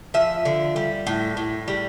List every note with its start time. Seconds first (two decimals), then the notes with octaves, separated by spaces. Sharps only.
0.14 F3 E5
0.45 D3
0.76 G3
1.07 A2
1.37 A2
1.68 G3